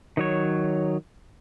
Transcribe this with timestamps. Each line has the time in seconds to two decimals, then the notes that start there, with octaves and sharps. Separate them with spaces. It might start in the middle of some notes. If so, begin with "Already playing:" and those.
0.17 D#3 F#3 C#5